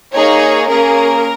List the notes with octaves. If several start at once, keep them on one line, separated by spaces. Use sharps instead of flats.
A#3 D#4 G#4 C#5
A#3 C#4 G#4 A#4